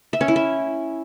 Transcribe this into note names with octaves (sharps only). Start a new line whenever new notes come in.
E5
C#4
E4
E5